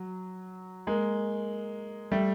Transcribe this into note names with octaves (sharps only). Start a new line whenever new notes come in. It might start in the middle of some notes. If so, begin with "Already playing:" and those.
Already playing: F#3
G#3 A#3
G3 A3